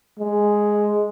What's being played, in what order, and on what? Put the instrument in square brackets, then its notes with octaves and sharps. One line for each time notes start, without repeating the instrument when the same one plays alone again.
[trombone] G#3